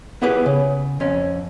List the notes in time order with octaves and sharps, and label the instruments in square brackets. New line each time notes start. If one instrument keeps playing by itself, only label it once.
[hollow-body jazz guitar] B3 E4 G4 G#4 B4
C#3
F2 C#4